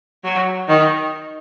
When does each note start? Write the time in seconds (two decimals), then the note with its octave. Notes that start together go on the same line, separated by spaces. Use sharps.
0.24 F#3
0.68 D#3